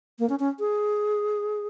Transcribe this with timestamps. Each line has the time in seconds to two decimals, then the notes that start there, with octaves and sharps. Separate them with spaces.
0.19 A#3
0.29 C#4
0.39 C#4
0.59 G#4